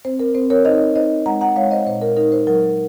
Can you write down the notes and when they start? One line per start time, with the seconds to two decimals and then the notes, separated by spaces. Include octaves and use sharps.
0.05 C4 C5
0.19 A#4
0.35 C4 C5
0.50 A#4 C#5
0.65 D#4 C5 D#5
0.96 D#4 C5 D#5
1.26 G#3 F#5 A#5
1.41 F#5 A#5
1.56 G#3 C#5 F5
1.71 C5 D#5
1.86 A#2 C5
2.02 A#4
2.17 D#4 A#4
2.32 C5
2.47 F#3 A#4